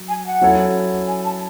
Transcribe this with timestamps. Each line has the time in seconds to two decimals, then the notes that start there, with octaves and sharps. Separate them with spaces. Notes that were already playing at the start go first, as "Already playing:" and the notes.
Already playing: F#3
0.08 G#5
0.25 F#5
0.41 F#3 C#4 E4 A4 C#5
1.08 G#5
1.24 A5